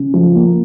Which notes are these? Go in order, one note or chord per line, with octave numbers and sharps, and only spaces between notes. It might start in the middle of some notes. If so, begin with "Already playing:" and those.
Already playing: C#3
F3
A#3